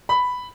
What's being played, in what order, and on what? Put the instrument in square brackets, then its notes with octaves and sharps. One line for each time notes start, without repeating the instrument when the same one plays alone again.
[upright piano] B5